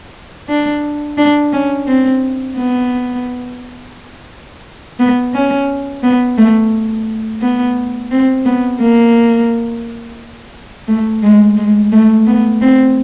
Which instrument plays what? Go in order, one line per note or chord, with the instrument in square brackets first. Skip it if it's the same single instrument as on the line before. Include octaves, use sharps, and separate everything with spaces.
[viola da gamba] D4
D4
C#4
C4
B3
B3
C#4
B3
A3
B3
C4
B3
A#3
A3
G#3
G#3
A3
B3
C4